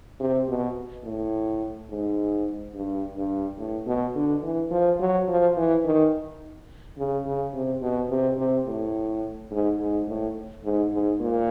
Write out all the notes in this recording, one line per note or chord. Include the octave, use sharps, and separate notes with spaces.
C3
B2
A2
G#2
G2
G2
A2
B2
D3
E3
F3
F#3
F3
E3
D#3
C#3
C#3
C3
B2
C3
C3
A2
G#2
G#2
A2
G#2
G#2
A#2